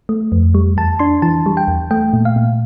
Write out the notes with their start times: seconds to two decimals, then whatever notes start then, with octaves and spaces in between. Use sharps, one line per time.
0.09 A3
0.32 F2
0.55 G3
0.77 E2 A5
0.99 D4 C6
1.22 E3 A5
1.46 G3
1.57 G5
1.68 E2
1.91 A3 G5
2.13 A#2
2.25 F5
2.36 A#2